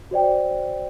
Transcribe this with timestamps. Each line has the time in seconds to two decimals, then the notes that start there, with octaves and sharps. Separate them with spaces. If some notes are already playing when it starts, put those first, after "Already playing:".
0.11 F#4 C5 D5 G5